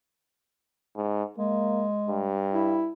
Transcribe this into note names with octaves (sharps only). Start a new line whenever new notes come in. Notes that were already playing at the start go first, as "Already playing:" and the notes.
G#2
G#3 A#3
G2
E4